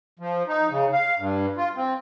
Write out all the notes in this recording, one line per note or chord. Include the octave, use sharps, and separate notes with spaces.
F3
D#4
C#3
F5
G2
F4
C4